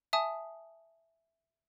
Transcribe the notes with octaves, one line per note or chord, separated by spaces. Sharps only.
E5 G#5 A5 D#6